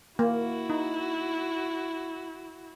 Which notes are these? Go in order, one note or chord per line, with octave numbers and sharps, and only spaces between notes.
A#3 E4 F#4
D#4